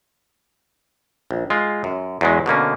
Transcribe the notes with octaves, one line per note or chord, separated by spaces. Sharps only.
A#1
G#3 F4
F#2
E2 F#3 G#3
B2 D3 A#3 C#4